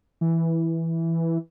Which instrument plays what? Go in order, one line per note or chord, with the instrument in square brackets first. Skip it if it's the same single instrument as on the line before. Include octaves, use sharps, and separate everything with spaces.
[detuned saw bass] E3